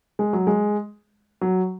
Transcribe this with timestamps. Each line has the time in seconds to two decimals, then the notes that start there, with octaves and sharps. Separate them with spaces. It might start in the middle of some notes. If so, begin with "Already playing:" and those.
0.19 G#3
0.33 F#3
0.47 G#3
1.41 F#3